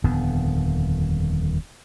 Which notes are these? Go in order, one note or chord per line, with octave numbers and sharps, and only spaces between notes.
D#1 F2 D3 B3